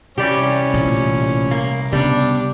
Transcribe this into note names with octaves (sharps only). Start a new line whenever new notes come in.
C2 E3 G3 C#4 G4
A1 A#2
A#3
C#3 G3 B3 D4